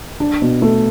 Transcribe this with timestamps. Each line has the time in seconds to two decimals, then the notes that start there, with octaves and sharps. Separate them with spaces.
0.20 D4
0.42 B2
0.62 A3